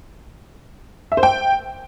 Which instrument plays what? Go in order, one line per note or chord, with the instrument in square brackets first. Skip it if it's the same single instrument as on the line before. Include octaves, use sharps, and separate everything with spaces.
[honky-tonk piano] E5
C5
G5